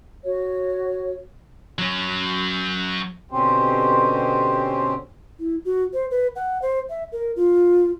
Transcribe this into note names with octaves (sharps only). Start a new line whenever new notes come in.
F#4 C#5
F#3 C#4
B2 D3 C4 C#4 G4 C5
E4
F#4
C5
B4
F#5
C5
E5
A#4
F4